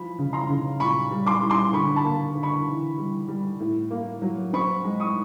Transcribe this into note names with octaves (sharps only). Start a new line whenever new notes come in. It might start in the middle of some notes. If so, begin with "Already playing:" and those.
Already playing: E3 F3 B5
C#3
A#5 C6
C#3
A#2 B5 C#6
G3
C6 D6
G3
C6 D6
D3 B5 C#6
A5 B5
A#3
D3
B5 C#6
E3
G3
G3
A2
A#3
F#3
C4 B5 C#6
G#3
C#6 D#6